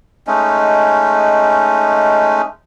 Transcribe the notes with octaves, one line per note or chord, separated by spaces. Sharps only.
G#3 A3 C#4 D#4